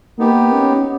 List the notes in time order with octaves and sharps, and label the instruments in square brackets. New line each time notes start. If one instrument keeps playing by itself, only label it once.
[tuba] A#3 [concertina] B3 D#4 G4
[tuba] C#4